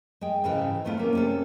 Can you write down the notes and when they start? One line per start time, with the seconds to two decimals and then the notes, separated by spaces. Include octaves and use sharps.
0.21 G#3 G5
0.44 G#2 C#3 E3 A4 G5
0.85 C3 A3 B3 E4 F4
0.98 A#3 C#4
1.13 C3 C#4 A4